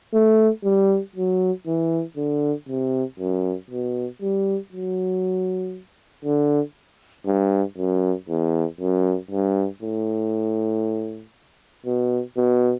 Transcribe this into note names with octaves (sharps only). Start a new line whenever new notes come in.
A3
G3
F#3
E3
D3
C3
F#2
B2
G3
F#3
D3
G2
F#2
E2
F#2
G2
A2
B2
B2